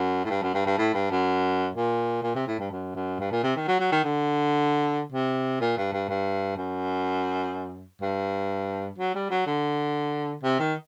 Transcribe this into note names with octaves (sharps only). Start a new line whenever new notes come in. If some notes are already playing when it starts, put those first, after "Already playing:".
Already playing: F#2
A2
G2
F#2
G2
G2
A2
G2
F#2
A#2
A#2
C3
A2
G2
F#2
F#2
G2
A#2
C3
D#3
F#3
F#3
D#3
D3
C3
A#2
G2
G2
G2
F#2
G2
F#3
G3
F#3
D3
C3
D#3